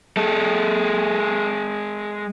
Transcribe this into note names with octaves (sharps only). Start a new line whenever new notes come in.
G#3 A4